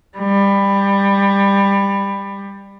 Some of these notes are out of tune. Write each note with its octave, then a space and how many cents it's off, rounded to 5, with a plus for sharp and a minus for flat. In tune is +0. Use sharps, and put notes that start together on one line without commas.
G3 +20